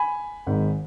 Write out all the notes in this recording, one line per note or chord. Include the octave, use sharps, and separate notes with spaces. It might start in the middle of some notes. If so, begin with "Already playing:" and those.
Already playing: G#5 B5
G#1 G#2 D#3